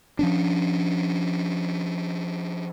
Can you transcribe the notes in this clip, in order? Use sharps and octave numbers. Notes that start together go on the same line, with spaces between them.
F3 C#4 D4